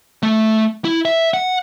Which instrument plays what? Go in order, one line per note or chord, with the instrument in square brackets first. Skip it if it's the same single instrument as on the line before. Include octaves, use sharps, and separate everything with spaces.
[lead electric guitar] A3
E4
E5
F#5